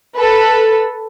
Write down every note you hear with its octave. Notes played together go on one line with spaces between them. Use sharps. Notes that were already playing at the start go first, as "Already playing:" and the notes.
A4 B4